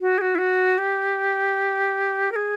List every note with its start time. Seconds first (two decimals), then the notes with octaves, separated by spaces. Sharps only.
0.01 F#4
0.18 G#4
0.21 F#4
0.35 E4
0.38 F#4
0.78 G4
2.32 A#4
2.36 G#4